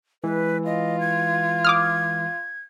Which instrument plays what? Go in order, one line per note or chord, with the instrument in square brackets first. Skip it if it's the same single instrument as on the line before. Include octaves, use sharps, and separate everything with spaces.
[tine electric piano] E3 G#3 [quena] B4
[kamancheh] F4 [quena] D#5
[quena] G#6
[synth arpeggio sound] D6 D#6 F6